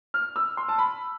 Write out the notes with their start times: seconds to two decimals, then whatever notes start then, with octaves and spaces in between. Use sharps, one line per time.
0.14 F6
0.36 E6
0.57 C6
0.69 A5
0.78 B5